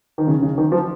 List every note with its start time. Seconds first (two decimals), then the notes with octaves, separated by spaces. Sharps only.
0.18 D#3
0.27 C#3
0.42 C#3
0.58 D#3
0.72 F3